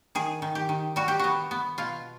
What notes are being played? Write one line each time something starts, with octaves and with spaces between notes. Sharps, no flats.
D#3 G#4
D#3
G4
D#3
G3 F#4
G4
B3 F#4
B3
B2 F4